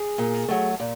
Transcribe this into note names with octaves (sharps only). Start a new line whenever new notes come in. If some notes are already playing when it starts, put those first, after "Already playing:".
Already playing: G#4
A#2
F#3 A3
A#2